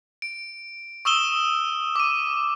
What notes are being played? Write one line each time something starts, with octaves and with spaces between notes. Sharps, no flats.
D7
C#6 D#6 E6 E7 G7
D6 D#7